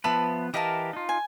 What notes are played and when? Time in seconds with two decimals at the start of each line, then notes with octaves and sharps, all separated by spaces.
0.04 F3 B3 B4 E5 A5 B5
0.54 E3 G4 A#4 D#5 F5 A5
0.93 D#4 F4
1.09 G#5